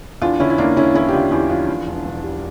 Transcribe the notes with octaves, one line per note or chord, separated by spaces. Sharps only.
E2 D4 F4
D3 C#4 E4
E4
E2 A#3 D4
D3 C#4 E4
E2 C#4 E4
G4
D3 D4 F4
E2 E4 G4
F3 D4 F4
E2
E1
E2
G3